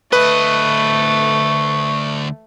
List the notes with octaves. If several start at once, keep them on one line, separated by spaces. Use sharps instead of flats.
D2 A3 B4 D#5 C#6